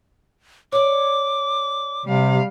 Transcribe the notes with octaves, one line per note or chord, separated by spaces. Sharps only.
C#5 D5 D6
C3 G3 F5